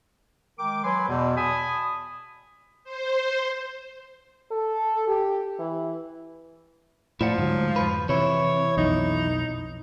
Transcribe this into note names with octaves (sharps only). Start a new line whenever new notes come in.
D#3 G#3 A#4 G5 D6
F#3 B4 G#5 C6
E2 B2
G#5 A5 B5 D#6
C5
A4
G4
E3
A2 F3 E4 D5 F#5
D2 G#2 F#3
F2 B2 B4
C3 E3 E4 C#5
B1 F2 D#4